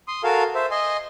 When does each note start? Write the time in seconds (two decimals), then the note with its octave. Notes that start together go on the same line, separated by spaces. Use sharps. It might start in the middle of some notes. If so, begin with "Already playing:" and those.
0.08 C6 D#6
0.24 F#4 A4 A#4 F5 G#5
0.55 C5 E5
0.71 D#5 G#5 C6